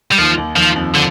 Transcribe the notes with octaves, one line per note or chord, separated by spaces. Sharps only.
G3
D#2 D#3 F3
D#2 D#3
D#2 D#3 F3
F2 F3
D3 F3